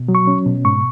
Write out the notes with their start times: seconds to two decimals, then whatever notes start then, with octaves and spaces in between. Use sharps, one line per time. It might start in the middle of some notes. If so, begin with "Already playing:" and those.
Already playing: B2
0.08 F#3
0.15 C#6
0.27 C#4
0.46 B2
0.65 G#2 C#6